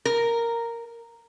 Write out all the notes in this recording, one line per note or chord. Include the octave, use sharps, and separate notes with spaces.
A#4